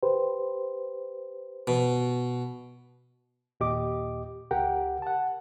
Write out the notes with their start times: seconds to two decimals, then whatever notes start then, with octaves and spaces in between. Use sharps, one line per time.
0.03 G4 B4 C5
1.67 B2
3.60 D#2 A#2 G4 D#5 D6
4.51 C#2 G4 A#4 F#5 G5
5.02 F#5 A5